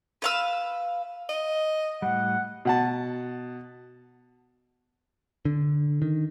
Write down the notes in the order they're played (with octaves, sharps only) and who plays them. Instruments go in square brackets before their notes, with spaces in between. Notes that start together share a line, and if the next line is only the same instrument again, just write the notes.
[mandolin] B4 F5 E6
[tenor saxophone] D#5
[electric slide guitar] A2 G3 [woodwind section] F#5
[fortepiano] B2 F#5 A5
[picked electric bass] D3
D#3